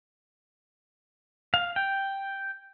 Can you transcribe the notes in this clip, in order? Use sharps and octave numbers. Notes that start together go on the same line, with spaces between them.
F5
G5